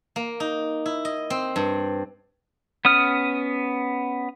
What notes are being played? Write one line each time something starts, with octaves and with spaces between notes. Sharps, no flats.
A#3
D#4
E4
D#5
C4
G2
B3 C#4 D#6 F6